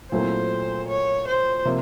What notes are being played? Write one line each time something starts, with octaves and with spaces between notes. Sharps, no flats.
A#2 F#3 A3 C4 E4 C5
C#5
C5
C3 F3 A#3